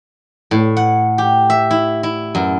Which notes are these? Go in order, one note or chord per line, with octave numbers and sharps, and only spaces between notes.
A2
F#5
G4
E5
E4
E4
F#2